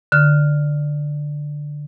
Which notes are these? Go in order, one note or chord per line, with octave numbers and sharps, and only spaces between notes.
D3 F6